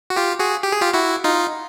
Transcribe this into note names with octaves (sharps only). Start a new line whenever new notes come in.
F#4
F4 G4
F#4 G#4
G4
G#4
F4 G4
E4 F#4
D#4 F4